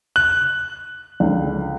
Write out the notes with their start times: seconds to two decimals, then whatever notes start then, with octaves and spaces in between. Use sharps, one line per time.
0.16 F#6 F#7
1.20 C#2 D3